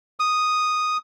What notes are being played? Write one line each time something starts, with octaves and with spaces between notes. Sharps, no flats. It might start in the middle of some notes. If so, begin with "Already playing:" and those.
D#6